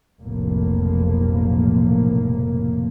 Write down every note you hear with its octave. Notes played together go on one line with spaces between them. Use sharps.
F1 B1 F2 A2 A#3